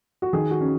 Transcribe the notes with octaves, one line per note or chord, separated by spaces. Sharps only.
F#4
D#3 G#4
F#4
C#4